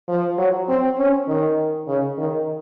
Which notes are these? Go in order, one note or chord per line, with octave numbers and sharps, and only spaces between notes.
F3
F#3
C4
C#4
D#3
C#3
D#3